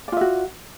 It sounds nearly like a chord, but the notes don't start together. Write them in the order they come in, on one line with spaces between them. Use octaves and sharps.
D5 F4 E5 F#4